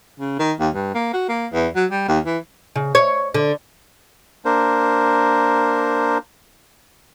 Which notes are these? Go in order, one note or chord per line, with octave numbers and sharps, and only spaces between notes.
C#3
D#3
D#2
G2
A#3
F#4
A#3
E2
F#3
G3
D#2
E3
C#3
C#5
D3
A#3 D4 A#4 C5